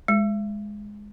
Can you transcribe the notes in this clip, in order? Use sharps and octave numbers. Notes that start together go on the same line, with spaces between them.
G#3